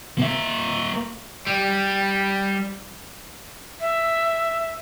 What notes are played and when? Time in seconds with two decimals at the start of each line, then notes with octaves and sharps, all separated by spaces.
0.18 A#3 E5
1.47 G3
3.80 E5